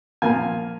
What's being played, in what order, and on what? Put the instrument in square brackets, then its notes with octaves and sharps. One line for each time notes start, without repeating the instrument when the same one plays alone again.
[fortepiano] A#2 F3 A#3 F4 G#5